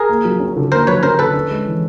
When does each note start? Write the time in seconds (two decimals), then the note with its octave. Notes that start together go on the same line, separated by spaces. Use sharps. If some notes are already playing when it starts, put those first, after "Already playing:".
Already playing: G#4 A#4
0.09 A#3
0.25 F#3
0.40 C#4
0.57 D3
0.72 A#3 A#4 C5
0.87 F#3 B4 C#5
1.03 C#4 A#4 C5
1.19 D3 A4 B4
1.34 C#4
1.51 G#3
1.67 E3